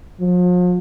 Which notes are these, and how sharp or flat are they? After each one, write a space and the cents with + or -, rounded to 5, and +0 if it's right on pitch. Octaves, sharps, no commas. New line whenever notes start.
F3 +40